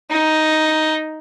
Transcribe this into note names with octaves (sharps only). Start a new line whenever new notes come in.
D#4